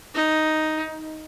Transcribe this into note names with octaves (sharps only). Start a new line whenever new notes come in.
D#4